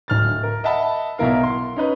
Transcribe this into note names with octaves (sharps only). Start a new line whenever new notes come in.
D1 F6 A6
A#4
D#5 E5 F#5 A5 B5
B1 B2 E4 A#4 F5
C6
C#4 D#4 B4